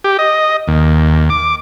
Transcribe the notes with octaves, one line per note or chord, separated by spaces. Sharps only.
G4
D#5
D#2
D6